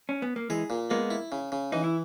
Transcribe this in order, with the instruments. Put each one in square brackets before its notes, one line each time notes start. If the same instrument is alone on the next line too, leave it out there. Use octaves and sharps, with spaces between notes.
[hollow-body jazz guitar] C#4
B3
A#3
[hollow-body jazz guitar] E3 G#3 [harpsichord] G#4
[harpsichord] A#2
[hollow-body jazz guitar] G#3 B3 [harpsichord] A#3
[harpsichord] E4
C#3
C#3
[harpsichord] E3 [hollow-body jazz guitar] D#4
[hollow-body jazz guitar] E4